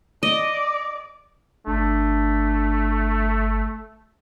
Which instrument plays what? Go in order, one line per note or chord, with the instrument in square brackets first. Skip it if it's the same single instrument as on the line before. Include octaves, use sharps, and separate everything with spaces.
[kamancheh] D5 [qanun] D#5
[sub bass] G1 [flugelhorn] A3 [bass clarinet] D4